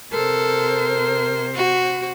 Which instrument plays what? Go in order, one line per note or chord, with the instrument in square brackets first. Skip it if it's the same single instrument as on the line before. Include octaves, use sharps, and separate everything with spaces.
[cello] C3 C5 [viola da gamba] A4 [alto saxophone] A#4
[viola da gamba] F#4